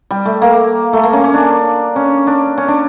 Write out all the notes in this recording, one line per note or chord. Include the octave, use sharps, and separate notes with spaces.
G3
A3
A#3
A3
A#3
C#4
C#4
D4
C#4
D4
C#4
D4